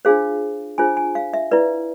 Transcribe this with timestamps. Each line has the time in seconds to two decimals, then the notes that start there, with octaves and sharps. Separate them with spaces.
0.05 D4 F4 G#4 C5 F5
0.78 D4 F4 G#4 C5 G#5
0.97 G#5
1.15 F5
1.33 E5
1.51 E4 B4 D5